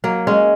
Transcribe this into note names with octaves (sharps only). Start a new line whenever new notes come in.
F#3 A#3
G#3 C#4